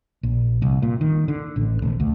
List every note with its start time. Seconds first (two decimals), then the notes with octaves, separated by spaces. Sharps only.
0.23 A#1
0.62 C2
0.82 A#2
1.01 D#3
1.28 D3
1.56 A1
1.82 D#1
2.00 D2